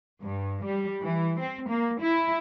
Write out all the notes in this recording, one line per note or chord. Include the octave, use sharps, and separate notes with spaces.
G2
G3
E3
C4
A#3
E4